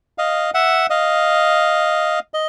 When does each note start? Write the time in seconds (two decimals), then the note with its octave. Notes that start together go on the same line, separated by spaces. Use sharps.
0.18 D#5 F5
0.54 E5 F#5
0.90 D#5 F5
2.34 D#5